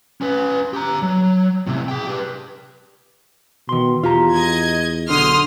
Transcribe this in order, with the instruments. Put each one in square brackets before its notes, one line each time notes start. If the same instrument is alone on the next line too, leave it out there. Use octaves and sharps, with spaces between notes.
[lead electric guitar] C#4 B4
G4 A#5
F#3
A2 C3
G#4 G5
G4 B4
[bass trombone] B2 [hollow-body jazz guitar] D#3 C6
[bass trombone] E2 [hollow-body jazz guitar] F4 G4 A#5
[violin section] D#5 G#6
[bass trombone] B1 [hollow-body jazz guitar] D3 [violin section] C6 D#6 F6